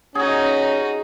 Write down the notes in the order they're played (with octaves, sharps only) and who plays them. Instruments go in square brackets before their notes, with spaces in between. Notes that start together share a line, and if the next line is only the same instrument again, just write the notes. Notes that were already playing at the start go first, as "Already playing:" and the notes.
[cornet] C#4 [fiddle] D#4 F#4 [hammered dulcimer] G#4